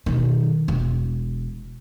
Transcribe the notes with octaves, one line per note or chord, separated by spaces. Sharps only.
B2 D#3
E1